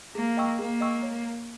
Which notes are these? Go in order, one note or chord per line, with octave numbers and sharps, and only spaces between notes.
A#3 G#4
D#5 G5 C#6 E6
A#3 G#4
D#5 G5 C#6 E6
C#5